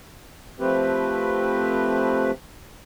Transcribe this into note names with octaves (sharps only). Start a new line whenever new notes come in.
F3 A3 C4 G4 B4